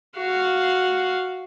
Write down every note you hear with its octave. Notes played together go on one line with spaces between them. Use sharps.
F#4 F5